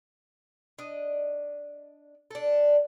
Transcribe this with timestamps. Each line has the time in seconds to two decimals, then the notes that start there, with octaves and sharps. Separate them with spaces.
0.79 D4 D#5
2.31 D4 A4